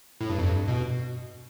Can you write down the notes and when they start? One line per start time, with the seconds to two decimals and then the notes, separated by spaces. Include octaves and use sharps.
0.21 A2
0.30 G2
0.39 F2
0.46 G2
0.68 B2